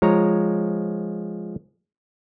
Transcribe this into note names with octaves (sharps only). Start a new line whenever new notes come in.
F3 G#3 C#5 A#5